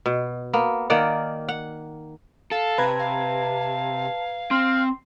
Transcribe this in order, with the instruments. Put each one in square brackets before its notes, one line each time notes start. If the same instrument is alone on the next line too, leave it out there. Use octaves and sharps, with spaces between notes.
[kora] B2
A#3 B3
D#3 A#3 D5 F#5
F#5
[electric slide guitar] A4 [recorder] F5
[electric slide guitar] C3 [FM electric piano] B4 A#5 G#6 [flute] A5
[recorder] F5
[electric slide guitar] C4 [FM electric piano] C6 [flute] F6